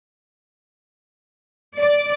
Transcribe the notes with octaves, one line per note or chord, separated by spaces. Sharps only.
D5